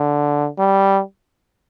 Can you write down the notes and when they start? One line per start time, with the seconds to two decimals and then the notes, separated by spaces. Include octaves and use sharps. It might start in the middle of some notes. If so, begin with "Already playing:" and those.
Already playing: D3
0.59 G3